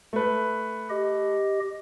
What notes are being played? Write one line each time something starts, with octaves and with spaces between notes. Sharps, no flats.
A3 B4
G4 D#5